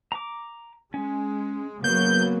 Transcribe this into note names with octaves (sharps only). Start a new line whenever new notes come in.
A#5 D6
G#3 C#4
C#3 F#3 A#3 B3 G6